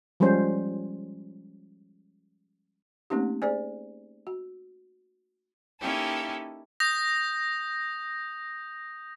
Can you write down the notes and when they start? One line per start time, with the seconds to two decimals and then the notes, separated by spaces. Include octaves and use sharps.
0.20 F3 G3 G#3 C#4 C5
3.10 A3 A#3 C4 C#4 D#4 G4
3.42 G#4 C5 D5 G#5
4.27 F#4
5.79 A#3 C#4 D#4 E4 G4 A4
6.80 D#6 G6 A#6